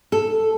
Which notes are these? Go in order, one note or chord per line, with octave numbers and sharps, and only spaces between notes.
A4